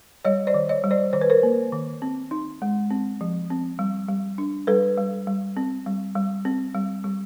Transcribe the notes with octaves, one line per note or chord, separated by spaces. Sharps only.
G3 C#5 D#5
C5 D5
D#3
C#5 D#5
G3
C5 D5
D#3 C5
B4
A#4 C5
A#3
D#3
C4
D#4
G#3
C4
F3
C4
G3
G3
D4
G3 A4 B4
G3
G3
C4
G3
G3
C4
G3
G3